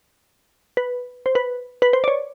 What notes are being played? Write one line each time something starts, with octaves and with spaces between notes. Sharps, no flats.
B4
C5
B4
B4
C5
D5
C#5